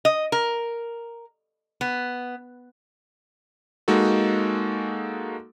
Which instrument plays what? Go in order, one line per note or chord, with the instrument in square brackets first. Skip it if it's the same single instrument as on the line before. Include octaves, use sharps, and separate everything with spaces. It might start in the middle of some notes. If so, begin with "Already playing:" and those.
[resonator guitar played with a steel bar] D#5
A#4
B3
[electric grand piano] G#3 A#3 D#4 F#4 A4